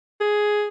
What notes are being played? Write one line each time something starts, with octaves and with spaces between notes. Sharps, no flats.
G#4